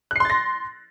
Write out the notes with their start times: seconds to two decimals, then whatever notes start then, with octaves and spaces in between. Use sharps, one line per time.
0.11 F#6
0.16 C7
0.20 C6
0.25 A6
0.30 A#6